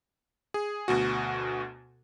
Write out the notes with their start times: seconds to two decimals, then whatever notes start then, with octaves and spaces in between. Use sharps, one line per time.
0.54 G#4
0.88 D2 B2 F#4